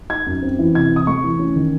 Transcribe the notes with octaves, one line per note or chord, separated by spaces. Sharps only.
D#4 G#6
F#2
C4
E3
C3 G#6
C3
D#6
A3 C#6
E3
C#4
D#3